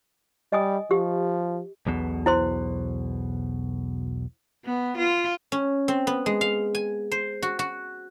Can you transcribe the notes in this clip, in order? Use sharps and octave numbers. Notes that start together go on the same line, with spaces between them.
G3 D#5 G#5 D#6
F3 G4
B1 E2 B2
E4 C5 C6
B3
F4
C#4
C4
B3
G#3
F5
G#5
C5
F#4
F#4